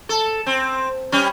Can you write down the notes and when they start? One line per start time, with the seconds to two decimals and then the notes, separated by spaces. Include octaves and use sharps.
0.09 A4
0.46 C4
1.12 G3 C#4